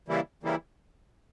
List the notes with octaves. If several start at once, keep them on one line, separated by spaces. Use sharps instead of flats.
C#3 E3 G3 A#3 E4
C#3 E3 G3 A#3 E4